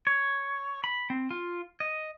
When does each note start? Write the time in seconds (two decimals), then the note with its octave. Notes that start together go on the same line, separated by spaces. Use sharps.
0.07 C#5
0.84 B5
1.10 C4
1.31 F4
1.80 D#5